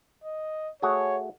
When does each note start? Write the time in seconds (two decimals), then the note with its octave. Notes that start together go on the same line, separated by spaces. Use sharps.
0.24 D#5
0.82 A3 F#4 G#4 C#5